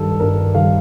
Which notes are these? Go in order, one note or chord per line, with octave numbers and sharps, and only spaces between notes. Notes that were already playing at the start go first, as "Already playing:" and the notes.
Already playing: G2 D#3 G3 A4
G2 A#4
D#3 G3 F5